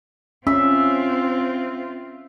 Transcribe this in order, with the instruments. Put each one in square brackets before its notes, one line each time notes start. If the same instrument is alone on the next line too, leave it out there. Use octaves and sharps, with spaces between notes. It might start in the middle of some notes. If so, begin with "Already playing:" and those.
[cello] C4 F4 [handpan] C#4 [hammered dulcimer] E5